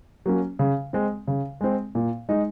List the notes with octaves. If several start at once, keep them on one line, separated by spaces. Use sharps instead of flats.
F#3 A#3 C#4
C#3
G#3 C4
C#3
G#3 C4
A#2
G#3 D#4